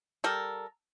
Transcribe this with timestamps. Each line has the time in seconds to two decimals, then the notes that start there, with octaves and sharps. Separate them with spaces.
0.24 G3 A4 A#4